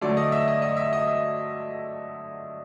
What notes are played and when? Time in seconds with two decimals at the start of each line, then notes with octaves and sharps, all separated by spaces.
0.01 D3 F#3 A3 D5
0.17 D#5
0.32 E5
0.48 D#5
0.62 D#5
0.77 E5
0.93 D#5
1.07 E5